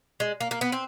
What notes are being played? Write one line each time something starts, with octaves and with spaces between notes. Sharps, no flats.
G#3
A#3
A#3
B3
C4